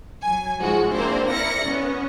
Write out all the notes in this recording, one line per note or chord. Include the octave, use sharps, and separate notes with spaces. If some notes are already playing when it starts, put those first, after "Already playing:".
F#3 G#5
G#2 F3 G#3 F#4
A#3 C4 D4 E4 C5
E4 A#4 D5 A#6 C#7
B3 C#4